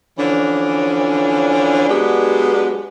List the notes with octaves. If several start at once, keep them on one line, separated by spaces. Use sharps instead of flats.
D3 E3 F3 C#4 D4
F#3 G#3 B3 D4 F#4 G4